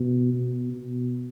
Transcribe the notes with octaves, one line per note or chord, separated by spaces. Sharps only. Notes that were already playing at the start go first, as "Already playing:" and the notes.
Already playing: B2
B2
B2